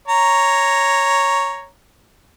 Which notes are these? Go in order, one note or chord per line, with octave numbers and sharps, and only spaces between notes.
C#5 A#5